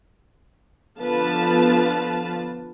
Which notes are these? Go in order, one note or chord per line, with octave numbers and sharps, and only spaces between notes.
D3 F3 B3 B4 F5 A5